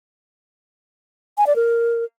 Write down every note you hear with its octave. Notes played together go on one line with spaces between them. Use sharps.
G#5
D5
A#4